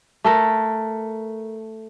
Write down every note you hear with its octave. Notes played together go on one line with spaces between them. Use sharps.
A3 A4 A#4